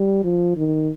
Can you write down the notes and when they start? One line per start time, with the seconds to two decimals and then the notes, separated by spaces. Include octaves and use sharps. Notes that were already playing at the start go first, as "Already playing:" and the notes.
Already playing: G3
0.24 F3
0.57 D#3